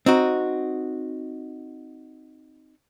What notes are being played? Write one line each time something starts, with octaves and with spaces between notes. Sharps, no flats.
C4 D#4 F#4